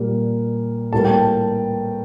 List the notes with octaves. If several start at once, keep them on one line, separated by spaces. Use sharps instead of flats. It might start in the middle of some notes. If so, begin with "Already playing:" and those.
Already playing: A#2 G3 A#3
A2 G3 A#3 A5
G5
A5